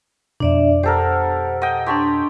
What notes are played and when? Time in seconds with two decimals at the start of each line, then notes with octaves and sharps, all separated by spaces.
0.40 F2 B2 D4 D5 E5
0.83 G4 A4 A#4 C5 F#5
1.62 D#5 F#5 G5
1.87 D4 G4 C#5 A5 C6